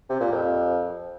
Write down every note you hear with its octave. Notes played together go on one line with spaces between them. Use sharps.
C3
A#2
F2